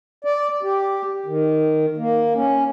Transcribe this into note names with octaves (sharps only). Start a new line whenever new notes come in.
D5
G4
D#3
A#3
C#4